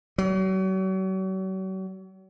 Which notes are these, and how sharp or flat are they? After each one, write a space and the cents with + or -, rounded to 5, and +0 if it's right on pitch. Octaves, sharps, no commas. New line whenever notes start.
F#3 +40